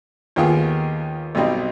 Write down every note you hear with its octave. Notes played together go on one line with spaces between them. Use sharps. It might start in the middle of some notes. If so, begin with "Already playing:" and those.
D#2 D#3 B3 F4 G#4
B1 B2 G3 C4 D#4